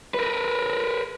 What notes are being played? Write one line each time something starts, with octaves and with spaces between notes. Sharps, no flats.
A#4 B4